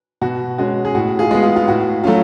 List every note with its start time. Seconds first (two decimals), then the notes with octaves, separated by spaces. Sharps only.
0.21 B2 F#4
0.58 G#3 C#4 F#4
0.85 G#4
0.95 A2 F#4
1.19 F4 G#4
1.31 G#3 B3
1.43 F4
1.56 F4
1.67 A2 F#4
2.04 F#3 A3 C#4 F4